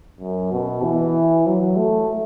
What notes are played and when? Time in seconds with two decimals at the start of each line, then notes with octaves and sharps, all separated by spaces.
0.21 F#2
0.52 B2
0.83 E3
1.46 F#3
1.77 A3